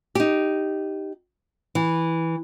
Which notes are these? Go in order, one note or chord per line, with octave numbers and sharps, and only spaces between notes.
D#4 G4
E3